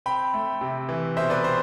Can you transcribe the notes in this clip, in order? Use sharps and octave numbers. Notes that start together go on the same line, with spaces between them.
C4 G5 B5
A3
C3
E3
B2 C5 E5
B4 D5
C4 C5